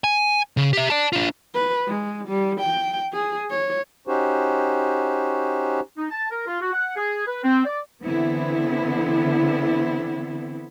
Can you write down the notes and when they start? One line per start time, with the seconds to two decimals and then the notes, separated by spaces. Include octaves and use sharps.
0.04 G#5
0.57 C#3
0.73 G4 E5
0.90 D5 A5
1.13 D4 F4
1.54 B4
1.88 G#3
2.28 G3
2.61 G5
3.13 G#4
3.50 C#5
4.08 C#4 D#4 F#4 G4 C5
5.98 D#4
6.11 A5
6.31 A#4
6.47 F4
6.61 F#4
6.73 F#5
6.96 G#4
7.27 B4
7.44 C4
7.66 D5
8.04 D3 E3 B3 C4 E4